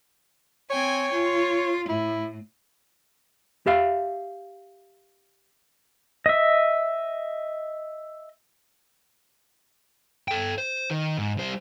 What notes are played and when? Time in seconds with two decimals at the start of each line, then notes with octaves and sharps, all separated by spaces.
0.70 C4 C#5 G5 G#5
1.13 F4
1.89 A2 E4
3.66 G4 E5 F5
6.26 D#5 E5
10.28 A4 G5
10.58 C5
10.91 D#3
11.17 G#2
11.38 G3 C5